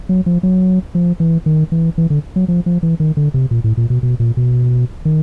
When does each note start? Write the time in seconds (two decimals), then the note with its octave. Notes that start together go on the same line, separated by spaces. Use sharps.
0.09 F#3
0.26 F3
0.43 F#3
0.95 F3
1.20 E3
1.46 D#3
1.72 E3
1.98 E3
2.10 D3
2.36 F#3
2.48 F3
2.66 F3
2.83 E3
3.00 D#3
3.17 D3
3.34 C3
3.51 A#2
3.64 A2
3.77 A#2
3.90 B2
4.03 B2
4.20 A#2
4.37 B2
5.05 D#3